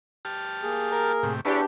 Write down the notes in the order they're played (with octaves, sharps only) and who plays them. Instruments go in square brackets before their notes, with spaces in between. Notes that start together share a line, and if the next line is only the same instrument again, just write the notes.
[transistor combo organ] G4 A5 F6
[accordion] A#3 G#4
[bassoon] A#4
[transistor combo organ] A2 C3 G4
[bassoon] E2 [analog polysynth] D4 G4 [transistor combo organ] E4 B4 C#5